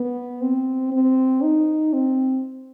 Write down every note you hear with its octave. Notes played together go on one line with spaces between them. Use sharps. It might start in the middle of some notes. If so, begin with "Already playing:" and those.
Already playing: B3
C4
C4
D#4
C4